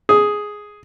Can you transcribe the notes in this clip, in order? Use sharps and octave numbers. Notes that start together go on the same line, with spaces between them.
G#4